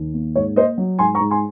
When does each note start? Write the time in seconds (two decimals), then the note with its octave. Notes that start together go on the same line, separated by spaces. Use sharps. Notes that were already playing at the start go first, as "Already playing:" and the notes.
Already playing: D#2
0.14 A#3
0.36 G#2 C#5
0.56 A#3 C5 D#5
0.78 F#3
0.99 G#2 G#5 C6
1.15 A#5 C#6
1.20 G#2
1.31 G#5 C6